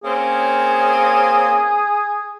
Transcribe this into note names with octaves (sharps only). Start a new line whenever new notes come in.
A#3 C4 C#4 G#4